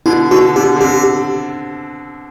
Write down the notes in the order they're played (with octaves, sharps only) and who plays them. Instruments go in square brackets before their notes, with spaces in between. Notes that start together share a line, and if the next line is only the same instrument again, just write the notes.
[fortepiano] B2 D3 [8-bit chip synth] E4
[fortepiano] B2 D3 [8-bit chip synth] F#4
[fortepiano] B2 D3 [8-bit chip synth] G4
[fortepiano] D3
[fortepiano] C3 [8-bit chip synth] G4